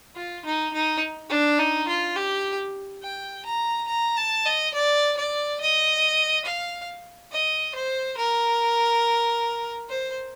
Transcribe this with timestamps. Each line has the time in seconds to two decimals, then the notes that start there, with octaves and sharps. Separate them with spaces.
0.16 F4
0.45 D#4
0.73 D#4
1.30 D4
1.58 D#4
1.88 F4
2.16 G4
3.03 G5
3.45 A#5
3.88 A#5
4.17 A5
4.45 D#5
4.74 D5
5.17 D5
5.60 D#5
6.45 F5
7.31 D#5
7.75 C5
8.17 A#4
9.89 C5